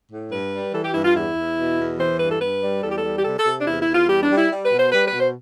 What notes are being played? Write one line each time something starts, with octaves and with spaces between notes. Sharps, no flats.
A2
G2 B4
G3
E3 A4
G4
G2 E4
F4
E2 E4
E2
B2
E2
E3 C5
G2 B4
A4
G2 B4
G3
E2 A4
G4
A4
G3
G4
C3 A4
A4
C3
D4
E2 E4
E4
E2
F4
G3 G4
D4
G3
E4
G3
B4
B2
C5
G3 B4
B4
B2
C5